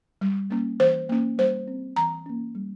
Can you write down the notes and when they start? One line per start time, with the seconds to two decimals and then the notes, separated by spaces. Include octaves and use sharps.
0.21 G3
0.50 A#3 C#4
0.80 E3 C5
1.09 A#3 C#4
1.38 G3 C5
1.68 C4
1.96 E3 A#5
2.26 A#3 C#4
2.55 G3